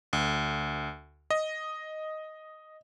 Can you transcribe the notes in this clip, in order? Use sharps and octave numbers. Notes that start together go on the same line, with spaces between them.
D2
D#5